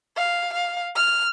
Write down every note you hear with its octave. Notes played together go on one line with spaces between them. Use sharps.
F5
F5
F6